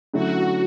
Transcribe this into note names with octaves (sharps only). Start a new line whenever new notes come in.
D3 F#3 A3 C#4 E4 F#4